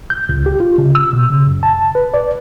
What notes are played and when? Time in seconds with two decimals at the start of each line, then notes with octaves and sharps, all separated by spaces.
0.10 G6
0.29 C#2
0.46 G4
0.60 F4
0.78 C#3
0.95 E6
1.13 B2
1.30 C#3
1.47 F#2
1.63 A5
1.95 B4
2.14 D5